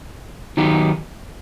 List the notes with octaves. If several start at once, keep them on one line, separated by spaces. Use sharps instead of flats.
D#3 F#3 B3 D#4 G4